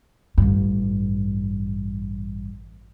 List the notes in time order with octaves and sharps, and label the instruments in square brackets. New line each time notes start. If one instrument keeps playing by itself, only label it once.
[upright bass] A1 G2